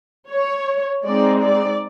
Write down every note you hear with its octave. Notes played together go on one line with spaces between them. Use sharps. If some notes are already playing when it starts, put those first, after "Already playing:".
C#5
G#3 C4 D#4 D5
D5